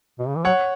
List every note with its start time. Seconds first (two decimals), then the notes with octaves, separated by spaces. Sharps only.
0.19 B2
0.28 C#3
0.37 E3
0.44 F#3 C#5 F#5